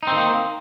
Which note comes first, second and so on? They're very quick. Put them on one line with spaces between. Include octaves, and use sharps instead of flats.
D#4 C4 D#3 A#3